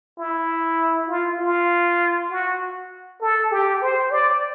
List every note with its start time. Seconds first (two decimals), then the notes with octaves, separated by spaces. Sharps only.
0.18 E4
1.09 F4
1.38 F4
2.30 F#4
3.21 A4
3.52 G4
3.82 C5
4.11 D5